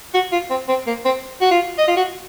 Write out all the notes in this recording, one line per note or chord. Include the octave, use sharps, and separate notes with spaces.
F#4
F4
C4
C4
A#3
C4
F#4
F4
D#5
F4
F#4